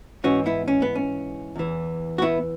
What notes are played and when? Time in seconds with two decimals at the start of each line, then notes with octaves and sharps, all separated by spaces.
0.24 G#2 E3 C#4 F#4
0.46 B3 E4
0.68 C#4
0.82 B3
0.95 C#4
1.56 E2 E3
2.18 F#4
2.22 B3 E4